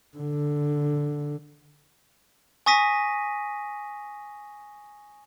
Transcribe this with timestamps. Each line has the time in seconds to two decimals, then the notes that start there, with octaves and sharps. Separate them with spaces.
0.17 D3
2.66 G#5 C#6 D#6 A#6 B6 D#7